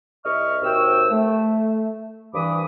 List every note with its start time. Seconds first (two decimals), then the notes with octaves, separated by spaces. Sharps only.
0.25 C2 D#5 E5 C#6 F6
0.63 D#2 C3 F#4 G5 E6
1.11 A3
2.34 C2 G2 E3 B5 D6 D#6